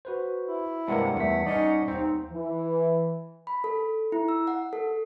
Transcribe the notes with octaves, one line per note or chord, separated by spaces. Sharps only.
F#4 B4 C5
E4
G2 C3 G#3 A#3 D4 A#4 F#5
E2 G3 A3 B6
C#4 D#4 D5
D#2 C4 D#4
E3
B5
A4
E4
E6
F#5
A4